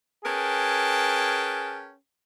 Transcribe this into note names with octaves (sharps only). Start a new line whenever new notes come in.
C#4 G#4 A#4 B4 G5 A5